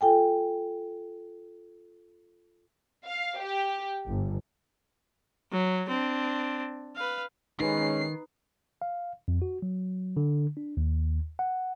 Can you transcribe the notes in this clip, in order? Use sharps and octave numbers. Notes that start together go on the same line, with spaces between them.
F4 A4 G5 G#5
F5
G4
G1
F#3
C4 D4
B4 F5
D#3 G#3 C#4 D#4 B4 C7
F5
F2
F#4
F#3
D3
D4
D#2
F#5